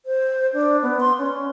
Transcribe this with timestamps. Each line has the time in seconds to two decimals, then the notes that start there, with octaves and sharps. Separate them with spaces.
0.06 C5
0.54 D4
0.82 B3
1.00 C6
1.18 C#4